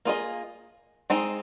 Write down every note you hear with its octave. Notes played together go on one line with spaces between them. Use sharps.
A#3 F4 G#4 D#5
G#3 C4 D#4 G#4